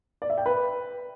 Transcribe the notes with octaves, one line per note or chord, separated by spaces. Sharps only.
D5
E5
G5
B4